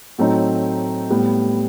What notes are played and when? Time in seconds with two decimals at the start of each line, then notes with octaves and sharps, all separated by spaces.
0.18 A2 F#3 A3 C4 D#4
1.10 A2 G3 B3